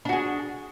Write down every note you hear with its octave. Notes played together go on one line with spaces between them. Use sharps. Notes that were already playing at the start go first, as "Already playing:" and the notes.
D4 F#4 G#4